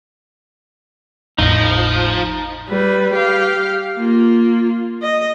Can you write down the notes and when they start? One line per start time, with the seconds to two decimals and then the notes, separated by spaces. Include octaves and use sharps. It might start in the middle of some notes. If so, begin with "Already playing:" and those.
1.39 G#1 E2 A2 F3 D#4 D#5
2.70 G3 B4
3.14 G4 F5
3.97 A#3 F4
5.02 D#5